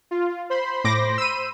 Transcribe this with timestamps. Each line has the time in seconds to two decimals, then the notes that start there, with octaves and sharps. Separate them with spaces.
0.11 F4
0.50 C5 B5 C6
0.84 A2 D6 A#6
1.18 E6 D#7